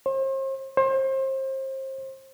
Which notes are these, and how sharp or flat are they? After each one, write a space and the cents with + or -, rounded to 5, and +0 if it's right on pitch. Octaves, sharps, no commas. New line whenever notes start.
C5 +40
C5 +30